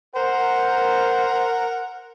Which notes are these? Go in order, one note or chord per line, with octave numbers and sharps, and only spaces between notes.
A#4 C5 F#5